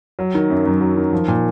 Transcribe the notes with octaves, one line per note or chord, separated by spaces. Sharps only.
F#3
D#3
F#2
F#2
F#3
D#3
F3
A#2